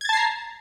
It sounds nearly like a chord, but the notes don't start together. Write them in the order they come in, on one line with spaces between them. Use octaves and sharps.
G#6 A6 A5 C7 A#5